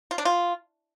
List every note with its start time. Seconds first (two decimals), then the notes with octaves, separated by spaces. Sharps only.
0.11 F4
0.18 D4
0.25 F4